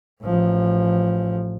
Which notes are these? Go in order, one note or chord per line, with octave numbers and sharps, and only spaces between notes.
A1 F3